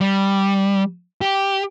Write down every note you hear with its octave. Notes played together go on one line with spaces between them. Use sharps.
G3
G4